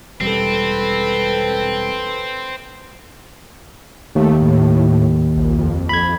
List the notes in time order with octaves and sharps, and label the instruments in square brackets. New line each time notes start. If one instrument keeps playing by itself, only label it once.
[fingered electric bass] E1 G3 [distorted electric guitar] C4 [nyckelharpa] A4 B4
[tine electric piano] D#2 [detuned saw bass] A3
[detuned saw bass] A2
A#1
F2
[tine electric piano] B5 G#6